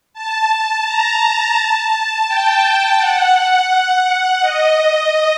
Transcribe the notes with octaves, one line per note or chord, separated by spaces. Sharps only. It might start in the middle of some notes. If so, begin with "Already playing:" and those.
A5
A#5
A5
G5
F#5
D#5